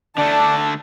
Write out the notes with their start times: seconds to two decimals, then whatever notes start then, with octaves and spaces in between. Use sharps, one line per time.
0.18 D3 A3 D4 D5 A5